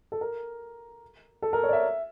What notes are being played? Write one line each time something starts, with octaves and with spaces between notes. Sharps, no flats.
A4
A#4
A4
A#4
C#5
D5
E5